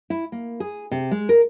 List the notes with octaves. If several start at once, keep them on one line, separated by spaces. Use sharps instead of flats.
E4
A#3
G#4
C3
G#3
A#4